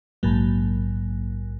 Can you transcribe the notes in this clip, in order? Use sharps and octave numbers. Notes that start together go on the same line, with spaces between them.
A#1 G#2 F#3 A#3